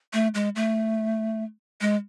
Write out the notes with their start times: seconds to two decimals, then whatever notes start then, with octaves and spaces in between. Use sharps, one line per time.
0.13 A3
0.34 G#3
0.55 A3
1.81 G#3